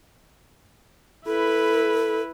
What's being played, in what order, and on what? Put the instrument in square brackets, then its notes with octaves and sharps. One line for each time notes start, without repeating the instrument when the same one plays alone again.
[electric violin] E4 B4 [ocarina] A4